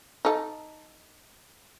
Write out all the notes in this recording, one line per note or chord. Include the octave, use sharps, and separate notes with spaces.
D#4 A4